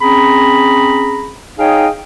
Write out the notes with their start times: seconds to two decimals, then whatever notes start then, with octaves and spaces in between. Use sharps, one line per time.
0.01 C4 C#4 G#4 A#5 B5
1.59 D#4 G#4 C#5 D#5 F5 G5